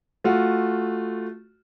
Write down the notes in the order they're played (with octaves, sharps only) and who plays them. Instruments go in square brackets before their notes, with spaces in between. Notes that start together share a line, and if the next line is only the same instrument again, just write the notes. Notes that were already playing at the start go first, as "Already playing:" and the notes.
[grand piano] A3 F4 F#4